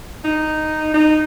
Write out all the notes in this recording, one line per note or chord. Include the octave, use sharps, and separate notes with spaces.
D#4
D#4